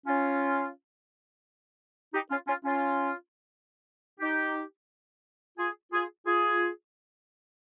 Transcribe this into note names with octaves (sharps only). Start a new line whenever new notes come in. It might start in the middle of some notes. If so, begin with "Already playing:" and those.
C#4 F4
D#4 G4
C#4 F4
C#4 F4
C#4 F4
D#4 G4
F4 G#4
F4 G#4
F4 G#4